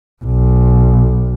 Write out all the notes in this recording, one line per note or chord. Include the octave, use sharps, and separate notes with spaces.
B1